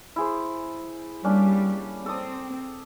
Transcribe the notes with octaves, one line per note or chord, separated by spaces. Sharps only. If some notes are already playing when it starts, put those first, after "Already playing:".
E4 G#4 C5
G3 A#3 C#4 D4
C4 A4 D6 D#6